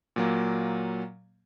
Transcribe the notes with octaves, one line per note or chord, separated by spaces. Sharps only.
A#2 F#3 A#3